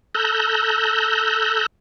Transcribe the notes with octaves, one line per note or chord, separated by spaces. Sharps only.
A4 A#5 E6 F#6 G6